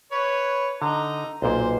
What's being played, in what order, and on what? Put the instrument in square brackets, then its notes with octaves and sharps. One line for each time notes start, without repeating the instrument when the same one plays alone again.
[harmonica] B4 C#5
[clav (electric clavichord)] D3 [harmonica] D#4 A#5
[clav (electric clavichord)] B1 A#2 [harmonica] C5